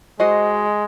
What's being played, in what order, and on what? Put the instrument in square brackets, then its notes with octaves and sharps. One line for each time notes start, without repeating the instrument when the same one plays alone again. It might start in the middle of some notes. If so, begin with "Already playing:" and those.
[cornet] G#3 [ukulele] F#4 C5 D#5